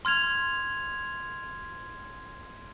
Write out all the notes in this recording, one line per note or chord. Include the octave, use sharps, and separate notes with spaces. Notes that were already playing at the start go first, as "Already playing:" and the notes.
C6 F6 G#6 F7